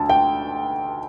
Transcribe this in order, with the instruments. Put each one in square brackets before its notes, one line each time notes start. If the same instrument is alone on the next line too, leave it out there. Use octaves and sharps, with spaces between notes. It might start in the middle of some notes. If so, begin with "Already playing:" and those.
Already playing: [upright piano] D2 D3 A5
G5